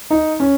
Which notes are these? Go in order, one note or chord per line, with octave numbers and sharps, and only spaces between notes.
D#4
C#4